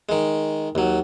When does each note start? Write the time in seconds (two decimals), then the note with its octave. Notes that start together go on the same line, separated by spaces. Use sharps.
0.09 D#3 G#3
0.75 D#2 F#3